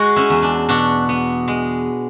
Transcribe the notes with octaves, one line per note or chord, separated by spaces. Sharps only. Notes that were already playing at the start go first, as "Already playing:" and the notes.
Already playing: G#3 F#4
C#4 E4
E2
D4
B2 D4 F#4
B3
G#3